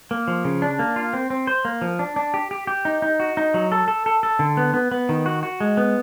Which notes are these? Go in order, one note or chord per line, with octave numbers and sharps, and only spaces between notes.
A#3
F3
C#3
D4
A#3
F4
C4
C4
C5
A#3
F3
D4
D4
G4
G4
G4
D#4
D#4
F#4
D#4
F#3
A4
A4
A4
A4
D3
B3
B3
B3
D#3
F#4
F#4
G#3
B3